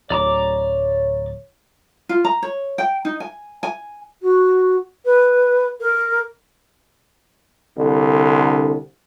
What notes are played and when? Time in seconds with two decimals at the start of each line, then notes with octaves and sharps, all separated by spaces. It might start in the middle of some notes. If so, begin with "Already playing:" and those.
0.10 D1 C#5 D5 A#5 D6
2.09 F4
2.24 A#5
2.42 C#5
2.78 G5
3.05 D#4
3.20 G#5
3.63 G#5
4.22 F#4
5.05 B4
5.80 A#4
7.77 C2 D3